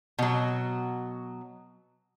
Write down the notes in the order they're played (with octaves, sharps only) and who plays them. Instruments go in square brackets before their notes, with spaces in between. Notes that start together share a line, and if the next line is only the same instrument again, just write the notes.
[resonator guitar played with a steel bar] B2 F#3